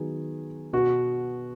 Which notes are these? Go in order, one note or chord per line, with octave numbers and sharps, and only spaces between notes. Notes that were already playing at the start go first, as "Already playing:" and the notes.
Already playing: D#3 F#3 B3 G#4
B2 B3 F#4